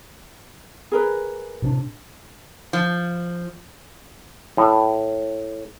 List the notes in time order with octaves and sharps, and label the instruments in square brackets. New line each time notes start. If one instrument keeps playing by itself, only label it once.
[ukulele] G#4 A#4 B4
[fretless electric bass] A2 C3 D4
[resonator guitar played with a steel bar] F3
[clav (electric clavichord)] A2